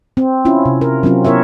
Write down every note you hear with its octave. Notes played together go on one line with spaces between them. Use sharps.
C4
C#4 E4 F4
C3
A#4
F#3 C4 C#4 F4
B3 E4 A#4 C#5 E5